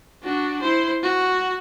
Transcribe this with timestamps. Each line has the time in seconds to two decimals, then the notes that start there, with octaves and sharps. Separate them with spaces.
0.23 D4 F#4
0.62 E4 C5
1.03 F#4